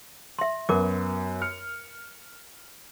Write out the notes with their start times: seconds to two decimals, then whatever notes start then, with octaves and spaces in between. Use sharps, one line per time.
0.39 E5 C6
0.69 F#2 B3 A#4 D6
1.42 F6 C#7